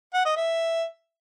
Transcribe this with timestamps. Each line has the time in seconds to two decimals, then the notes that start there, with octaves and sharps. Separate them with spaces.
0.14 F#5
0.25 D#5
0.37 E5